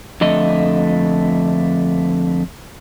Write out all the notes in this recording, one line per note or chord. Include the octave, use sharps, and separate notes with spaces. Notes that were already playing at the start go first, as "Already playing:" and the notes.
F2 D3 A3 D#5